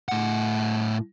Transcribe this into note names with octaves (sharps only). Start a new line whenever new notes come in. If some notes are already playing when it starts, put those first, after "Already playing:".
A2 F#5